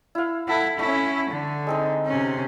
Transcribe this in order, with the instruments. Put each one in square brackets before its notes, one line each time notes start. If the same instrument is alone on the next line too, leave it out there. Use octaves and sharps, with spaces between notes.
[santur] E4 F5
[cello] E4 [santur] A4 F#5
[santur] A3 E5 [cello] C#4 E4
[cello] D3
[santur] G#3 C4 D#4
[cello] C3 C#4